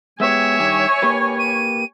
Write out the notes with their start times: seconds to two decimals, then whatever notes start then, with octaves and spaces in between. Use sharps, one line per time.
0.20 G#3 B3 G4 C#5 E5 G#5
0.59 G2 D#3 G4
1.02 A#3 G4 B4
1.39 D#7